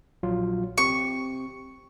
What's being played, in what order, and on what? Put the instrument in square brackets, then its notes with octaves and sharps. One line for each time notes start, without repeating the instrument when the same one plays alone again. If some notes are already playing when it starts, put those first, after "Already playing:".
[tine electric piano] A#1 F#3 F4
[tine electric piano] C4 G4 [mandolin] C#6